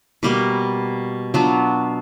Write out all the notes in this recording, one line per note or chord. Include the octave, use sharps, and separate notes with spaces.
B2 G3 A#3
F#3 B3 D4 F4